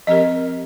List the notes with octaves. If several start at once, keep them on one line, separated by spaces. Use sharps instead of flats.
F3 C4 G4 A#4 D#5